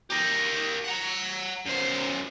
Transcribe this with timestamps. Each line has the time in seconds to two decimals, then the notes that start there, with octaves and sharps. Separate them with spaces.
0.10 G4 A#4
0.85 F#5 A#5
1.65 F#2 C5